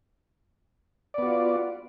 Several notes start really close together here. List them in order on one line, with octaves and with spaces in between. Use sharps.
D5 B3 F#4 F4